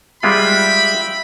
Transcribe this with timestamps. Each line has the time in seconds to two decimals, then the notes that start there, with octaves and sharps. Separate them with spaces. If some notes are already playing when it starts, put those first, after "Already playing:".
0.23 G3 G#3 F4 E5 G5 B5